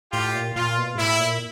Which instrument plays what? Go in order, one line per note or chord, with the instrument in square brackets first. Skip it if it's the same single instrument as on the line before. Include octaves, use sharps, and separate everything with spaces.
[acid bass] A2 [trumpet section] F4 G4
[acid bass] A#2
[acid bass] A#2 [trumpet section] F4
[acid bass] B2
G#2
[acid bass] A2 [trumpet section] E4
[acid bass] A#2